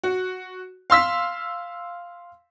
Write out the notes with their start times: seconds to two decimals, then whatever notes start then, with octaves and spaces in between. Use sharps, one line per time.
0.03 F#4
0.90 F5 C6 E6 B6